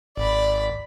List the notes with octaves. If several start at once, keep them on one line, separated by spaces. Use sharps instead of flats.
G#1 D5 B5